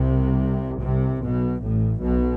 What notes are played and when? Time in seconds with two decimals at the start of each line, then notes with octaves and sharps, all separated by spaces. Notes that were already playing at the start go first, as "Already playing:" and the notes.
Already playing: C2 C3
0.81 C2 C3
1.21 B1 B2
1.61 A1 A2
2.01 B1 B2